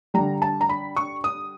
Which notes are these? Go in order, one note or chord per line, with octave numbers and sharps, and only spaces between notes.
D3 G3 A#5
A5
A#5
B5
C#6
D#6